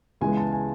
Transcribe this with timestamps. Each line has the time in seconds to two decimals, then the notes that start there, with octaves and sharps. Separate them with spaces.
0.21 C#2 C#3 E3 G#3 B3 G#5
0.37 A5
0.52 G#5